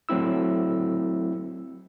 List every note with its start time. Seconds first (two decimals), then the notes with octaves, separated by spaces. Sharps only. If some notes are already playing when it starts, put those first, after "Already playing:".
0.09 F#3 A3 C4 E4 E6